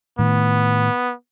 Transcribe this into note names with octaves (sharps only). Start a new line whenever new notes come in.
A2 D#3 B3